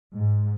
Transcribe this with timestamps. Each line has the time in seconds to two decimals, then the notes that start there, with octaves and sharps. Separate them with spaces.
0.14 G#2